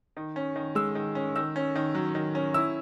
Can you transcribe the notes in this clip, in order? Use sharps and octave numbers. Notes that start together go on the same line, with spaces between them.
D#3
C#4
D#3
G#3 E6
D#3
C#4
D#3 E6
C#4
D#3
F#3
D#3
C#4
E4 E6